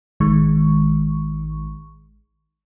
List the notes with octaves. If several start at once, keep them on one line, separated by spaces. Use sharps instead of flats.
A1 D#3 G#3 C#6